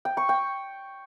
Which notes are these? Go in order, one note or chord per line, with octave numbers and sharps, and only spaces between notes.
G5
C#6
G5